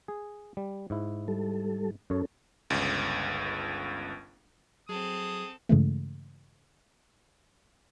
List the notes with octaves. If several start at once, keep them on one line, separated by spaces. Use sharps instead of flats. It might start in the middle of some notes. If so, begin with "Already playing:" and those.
G#4
G3
G#2 E4
G3 A4
F#2 C#4 A4 C#5
G1 C#2
F#3 C4 G#4 A4 D#6
G2 C#3 E3 G#3 A3